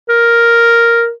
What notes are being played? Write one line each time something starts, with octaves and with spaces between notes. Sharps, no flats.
A#4